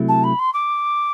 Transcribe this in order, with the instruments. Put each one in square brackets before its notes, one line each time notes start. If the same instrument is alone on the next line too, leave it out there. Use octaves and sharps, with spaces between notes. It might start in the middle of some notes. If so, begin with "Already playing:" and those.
Already playing: [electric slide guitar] C3 F#3 A3 E4
[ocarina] A5
B5
C6
D6